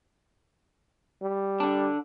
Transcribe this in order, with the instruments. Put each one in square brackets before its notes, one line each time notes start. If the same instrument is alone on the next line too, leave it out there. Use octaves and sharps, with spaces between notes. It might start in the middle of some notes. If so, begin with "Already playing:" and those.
[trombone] G3
[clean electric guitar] D3 D4